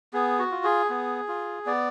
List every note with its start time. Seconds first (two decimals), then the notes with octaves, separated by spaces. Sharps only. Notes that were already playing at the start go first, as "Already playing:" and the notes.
0.13 B3 G#4
0.39 F#4
0.52 F4
0.64 G#4
0.90 B3
1.28 F4
1.66 B3 D5